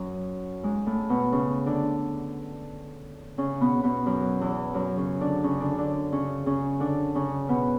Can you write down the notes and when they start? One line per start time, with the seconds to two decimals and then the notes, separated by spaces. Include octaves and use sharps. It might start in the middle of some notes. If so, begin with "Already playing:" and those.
Already playing: F#2 F#3
0.63 G#2 G#3
0.86 A2 A3
1.10 B2 B3
1.32 C#3 C#4
1.66 D3 D4
3.38 C#3 C#4
3.61 B2 B3
3.83 B2 B3
4.06 F#2 F#3
4.41 E2 E3
4.74 F#2 F#3
4.97 C#3 C#4
5.21 D3 D4
5.43 C#3 C#4
5.60 D3 D4
5.78 D3 D4
6.12 C#3 C#4
6.46 C#3 C#4
6.80 D3 D4
7.15 C#3 C#4
7.49 B2 B3